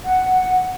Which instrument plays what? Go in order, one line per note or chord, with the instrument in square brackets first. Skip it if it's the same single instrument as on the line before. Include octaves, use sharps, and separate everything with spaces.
[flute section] F#5